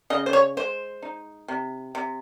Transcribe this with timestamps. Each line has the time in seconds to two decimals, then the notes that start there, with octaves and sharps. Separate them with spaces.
0.10 C#3 D#5
0.26 C5
0.33 C#5
0.57 G#3 C5
1.02 D#4
1.48 C3
1.95 C3